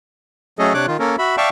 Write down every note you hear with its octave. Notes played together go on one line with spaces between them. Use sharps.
F#3 A3 C#4 G#4 A4 D#5
C3 D4 C#5 D6 F#6
D#3 F4
A#3 C#4 A4 A#4
F#4 E5 B5
D5 E5 F5 G5 A5 C#6